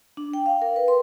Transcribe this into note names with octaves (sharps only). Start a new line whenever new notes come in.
D4
G5
F5
A#4
B4
C6